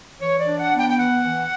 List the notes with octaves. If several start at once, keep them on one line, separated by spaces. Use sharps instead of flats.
E3 C#5
D5
D4
F#5
B3
G5
G5
E3 F#5
E3